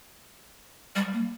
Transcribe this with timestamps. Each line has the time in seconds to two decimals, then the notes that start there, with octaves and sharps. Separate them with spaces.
0.96 G3
1.13 A#3